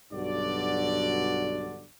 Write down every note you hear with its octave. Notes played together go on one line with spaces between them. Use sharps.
B1 G2 D3 F#4 D5